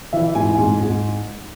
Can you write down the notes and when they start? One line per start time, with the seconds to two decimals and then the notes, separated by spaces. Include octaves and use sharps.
0.13 E3 E5
0.35 G#2 G#5
0.58 G#2
0.80 G#2